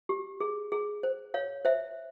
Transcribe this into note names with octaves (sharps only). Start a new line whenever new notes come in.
G4
G#4
G#4
C5
C#5 F5
C5 E5